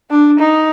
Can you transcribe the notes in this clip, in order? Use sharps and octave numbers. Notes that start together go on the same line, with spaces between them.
D4
D#4